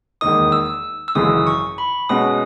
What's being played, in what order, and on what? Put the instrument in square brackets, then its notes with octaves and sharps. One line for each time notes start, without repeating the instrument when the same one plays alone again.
[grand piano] E1 D#2 D#3 A#3 D#4 [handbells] D#6
[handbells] E6
E6
[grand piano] G#1 F#2 C#3 E3 G#3 [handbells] D#6
[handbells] C#6
B5
[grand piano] B2 G#3 C#4 F#4 [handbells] D#6